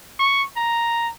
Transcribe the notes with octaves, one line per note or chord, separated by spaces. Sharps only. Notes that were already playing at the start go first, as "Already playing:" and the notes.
C#6
A#5